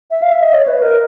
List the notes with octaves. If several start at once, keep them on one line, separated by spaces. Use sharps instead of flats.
E5
F5
E5
D#5
C#5
B4
A#4